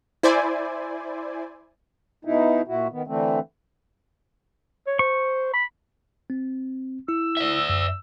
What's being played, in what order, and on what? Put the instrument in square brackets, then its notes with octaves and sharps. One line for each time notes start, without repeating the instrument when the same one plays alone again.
[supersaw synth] E4 C5 D5 G#5
[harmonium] B2 D#4 E4
A#2 E4 F#4
D#3 B3
D3 E3 A3 C4
[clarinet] C#5
[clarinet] C5 [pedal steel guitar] C#6
[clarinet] B5
[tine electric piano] C4
[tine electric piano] E4 [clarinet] E6
[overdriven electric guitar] D5 E5
[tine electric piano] F#2